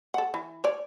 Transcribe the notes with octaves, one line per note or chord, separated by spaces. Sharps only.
A4 F#5
E3
C#5 D5